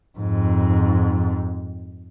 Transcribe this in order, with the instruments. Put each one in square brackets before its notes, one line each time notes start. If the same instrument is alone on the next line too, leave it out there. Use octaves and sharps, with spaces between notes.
[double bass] F2 G#2